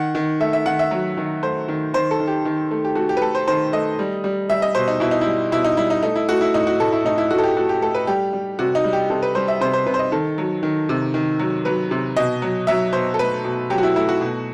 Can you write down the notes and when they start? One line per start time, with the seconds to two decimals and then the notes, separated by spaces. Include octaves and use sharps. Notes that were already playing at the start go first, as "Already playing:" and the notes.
Already playing: D#3 F#5
0.15 D#3
0.40 A3 E5
0.53 E5
0.66 D#3 F#5
0.79 E5
0.91 F#3
1.17 D#3
1.43 A3 C5
1.68 D#3
1.94 D#3 C5
2.11 A4
2.20 D#3
2.28 G4
2.45 D#3
2.71 A3
2.84 G4
2.95 A3 F#4
3.09 G4
3.17 B4
3.22 A3 A4
3.35 C5
3.48 D#3 C5
3.73 A3 D#5
3.99 G3
4.24 G3
4.49 G3 E5
4.62 D#5
4.75 B2 C5
4.88 D#4
5.00 B2 E4
5.11 D#4
5.21 G3 E4
5.52 B2 E4
5.65 D#4
5.77 G3 E4
5.90 D#4
6.03 A3 D#4
6.15 E4
6.28 A3 F#4
6.41 E4
6.54 A2 D#4
6.67 F#4
6.80 A2 A4
6.92 E4
7.05 A2 D#4
7.18 E4
7.31 A3 F#4
7.38 A4
7.44 G4
7.56 A3 F#4
7.69 G4
7.82 A3 A4
7.95 B4
8.07 G3 G4
8.33 G3
8.59 C3 F#4
8.75 D#4
8.84 G3
8.93 G4
9.10 C3 A4
9.23 B4
9.35 G3 C5
9.48 E5
9.61 C3 C5
9.73 C5
9.86 C3 B4
9.94 C5
9.99 D#5
10.12 D#3 A4
10.38 F#3
10.63 D#3
10.89 C3
11.14 D#3
11.39 F#3
11.65 F#3 B4
11.91 C3
12.17 B2 D#5
12.42 F#3
12.67 F#3 E5
12.93 B2 C5
13.14 A4
13.19 A3 B4
13.45 B2
13.70 F#3 G4
13.78 F#4
13.83 E4
13.95 A3 E4
14.09 F#4
14.21 B2